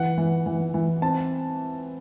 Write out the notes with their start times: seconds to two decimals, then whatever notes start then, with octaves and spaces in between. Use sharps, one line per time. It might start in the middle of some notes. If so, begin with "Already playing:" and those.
Already playing: E3 F#5
0.18 E3
0.46 E3
0.74 E3
1.02 C4 A5